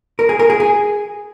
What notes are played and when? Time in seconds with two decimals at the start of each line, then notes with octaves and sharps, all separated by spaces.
0.19 A#4
0.29 G#4
0.39 A#4
0.50 G#4
0.60 G#4